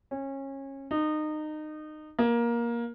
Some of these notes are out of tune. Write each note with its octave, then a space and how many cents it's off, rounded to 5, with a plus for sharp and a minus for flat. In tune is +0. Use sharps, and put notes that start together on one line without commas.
C#4 -25
D#4 -25
A#3 +15